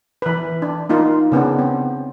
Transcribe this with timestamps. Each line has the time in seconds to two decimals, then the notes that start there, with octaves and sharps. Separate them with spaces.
0.22 E3 B4
0.62 D4
0.89 A#3 D#4 F4
1.32 C#3 B3 C#4 D4
1.59 C4